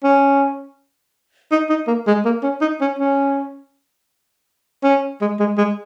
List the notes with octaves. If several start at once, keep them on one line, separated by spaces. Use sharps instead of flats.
C#4
D#4
D#4
A#3
G#3
A#3
C#4
D#4
C#4
C#4
C#4
G#3
G#3
G#3